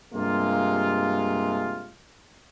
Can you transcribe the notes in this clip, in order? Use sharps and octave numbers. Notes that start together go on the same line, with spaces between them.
G2 C3 G#3 A#3 F4